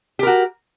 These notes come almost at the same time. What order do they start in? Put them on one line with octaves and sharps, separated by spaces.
G4 A#4 F#4